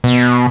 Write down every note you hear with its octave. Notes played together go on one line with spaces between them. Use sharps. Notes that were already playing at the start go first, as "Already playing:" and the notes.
B2